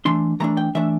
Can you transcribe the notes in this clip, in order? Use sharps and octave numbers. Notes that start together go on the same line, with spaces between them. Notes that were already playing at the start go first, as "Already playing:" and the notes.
E3 A3 D4 C6
E3 A3 D4 A#5
G5
E3 A3 D4 E5